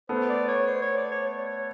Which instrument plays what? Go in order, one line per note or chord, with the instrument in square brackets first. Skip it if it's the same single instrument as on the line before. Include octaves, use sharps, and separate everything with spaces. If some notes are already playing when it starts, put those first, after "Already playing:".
[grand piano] A3 B3 [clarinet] C5
[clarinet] D5
C#5
C5
C#5
D5
C#5
C#5
C#5